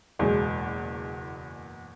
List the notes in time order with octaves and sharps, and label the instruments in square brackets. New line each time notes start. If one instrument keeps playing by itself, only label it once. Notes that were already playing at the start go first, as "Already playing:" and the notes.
[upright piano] F#1 E2 B2 G#3